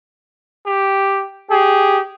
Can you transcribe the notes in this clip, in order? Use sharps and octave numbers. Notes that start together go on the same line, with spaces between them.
G4
G4 G#4